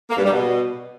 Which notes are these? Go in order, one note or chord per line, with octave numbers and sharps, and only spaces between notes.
A#3
G2
G3
B2